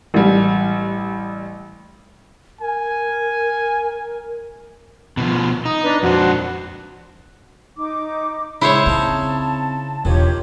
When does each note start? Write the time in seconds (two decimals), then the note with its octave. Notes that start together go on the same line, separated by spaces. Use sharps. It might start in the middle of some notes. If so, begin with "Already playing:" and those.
0.14 A1 G3
2.61 A#4 G#5
5.17 B2 E3 F3
5.65 D#4 D#6
5.83 D4 B4
6.03 F2 D4 F#4 C5
7.76 D#4 D6
8.61 C#3 G#3 E4 C5 C#5
8.86 C#3 C4 D#4 A5
10.05 E1 D#3 F3 F4 G4 C#5